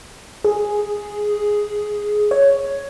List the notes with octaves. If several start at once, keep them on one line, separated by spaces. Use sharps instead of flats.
G#4
C#5